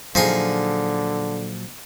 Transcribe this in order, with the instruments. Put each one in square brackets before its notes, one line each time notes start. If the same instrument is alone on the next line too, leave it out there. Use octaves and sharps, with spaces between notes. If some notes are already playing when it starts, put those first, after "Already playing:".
[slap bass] A#2 F#3 [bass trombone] D3 [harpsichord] F3 D#4 G#4